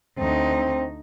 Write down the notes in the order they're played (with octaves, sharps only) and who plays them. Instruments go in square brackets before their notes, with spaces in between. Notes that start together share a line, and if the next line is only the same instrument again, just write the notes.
[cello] D2 D#4 [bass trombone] C4